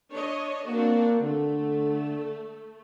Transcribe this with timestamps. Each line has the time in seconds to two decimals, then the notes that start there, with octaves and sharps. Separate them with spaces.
0.11 D4 C#5 D#5
0.68 A#3 C4 D4 F#4
1.21 D3 A3